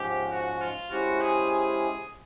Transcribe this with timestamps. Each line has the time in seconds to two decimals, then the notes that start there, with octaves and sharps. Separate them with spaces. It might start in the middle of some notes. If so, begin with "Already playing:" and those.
Already playing: G#2 F3 G#3 C#4 G4
0.31 F#4
0.61 F4
0.91 G#3 C#4 E4 F#4 G4 C5
1.21 G#4
1.50 G#4